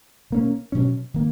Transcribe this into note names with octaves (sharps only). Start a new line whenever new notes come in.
B2 A#3 C#4
B2 F#3 C#4
D#3 A#3